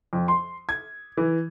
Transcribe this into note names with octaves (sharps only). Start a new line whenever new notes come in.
F2
C6
G#6
E3